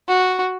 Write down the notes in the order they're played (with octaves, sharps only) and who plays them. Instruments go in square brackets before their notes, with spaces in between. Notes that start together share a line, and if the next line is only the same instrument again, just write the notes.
[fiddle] F#4